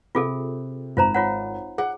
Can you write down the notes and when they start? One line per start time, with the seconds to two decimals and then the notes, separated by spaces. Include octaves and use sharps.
0.15 C3 F4 G#4 A4
0.97 G#1 F4 C5 A#5
1.14 F4 C#5 F#5
1.78 G#4 F#5